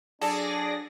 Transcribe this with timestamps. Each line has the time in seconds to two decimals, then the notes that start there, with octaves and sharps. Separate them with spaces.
0.21 F#3 D4 G#4 A4 D5 A#6